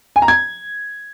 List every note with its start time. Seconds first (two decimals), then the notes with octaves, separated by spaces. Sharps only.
0.16 G#5
0.22 A#5
0.28 G#6